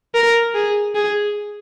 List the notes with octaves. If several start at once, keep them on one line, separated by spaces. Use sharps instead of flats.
A#4
G#4
G#4